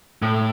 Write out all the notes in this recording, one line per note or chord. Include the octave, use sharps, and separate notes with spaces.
A2